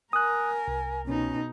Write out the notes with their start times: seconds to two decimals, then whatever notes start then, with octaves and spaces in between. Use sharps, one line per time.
0.13 A#4 G#5 D#6 F#6
0.68 C2
1.06 B2 C#4 D#4